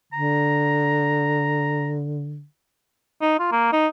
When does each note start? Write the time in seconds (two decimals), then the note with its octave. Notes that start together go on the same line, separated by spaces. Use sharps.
0.13 D3 A#5
3.21 D#4
3.39 F4
3.52 A#3
3.73 D#4